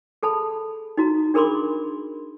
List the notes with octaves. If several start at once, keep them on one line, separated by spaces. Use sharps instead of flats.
G#4 A4 A5 B5
D#4 F#4 A#5
D4 G#4 A#4 B5 C6 D6